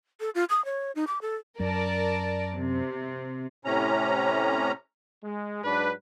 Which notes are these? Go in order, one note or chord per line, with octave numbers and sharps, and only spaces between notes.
A4
F4
D#6
C#5
D#4
D6
A4
F#2 A#4 D5 A5
C3
A2 C3 C#4 A#5
G#3
G#2 F#3 D4 B4